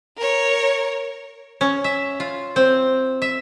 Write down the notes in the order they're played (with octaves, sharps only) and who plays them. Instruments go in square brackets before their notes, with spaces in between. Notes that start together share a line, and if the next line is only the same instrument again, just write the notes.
[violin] A#4 C#5
[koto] C#4
E5
F4
C4
E5